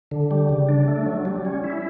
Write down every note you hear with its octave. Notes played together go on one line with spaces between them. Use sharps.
D3
G3
C#3
D4
A3
F#3
G3
C#4
E4